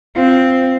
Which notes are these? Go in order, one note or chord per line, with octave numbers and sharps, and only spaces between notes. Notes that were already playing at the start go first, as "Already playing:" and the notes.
C4 F4